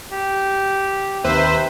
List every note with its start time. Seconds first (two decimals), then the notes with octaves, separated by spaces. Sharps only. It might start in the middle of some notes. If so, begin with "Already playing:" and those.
0.11 G4
1.24 D#2 C3 B4 C5 E5